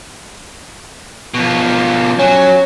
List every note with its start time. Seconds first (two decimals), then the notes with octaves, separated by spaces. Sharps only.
1.34 B2 F3
2.19 F#3 C#4